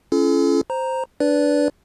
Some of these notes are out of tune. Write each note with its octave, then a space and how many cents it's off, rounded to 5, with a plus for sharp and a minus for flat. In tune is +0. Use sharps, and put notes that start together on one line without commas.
C#4 +0 F4 -45 A4 -40
C5 +0 A#5 +0
D4 +0 B4 +0 D5 -20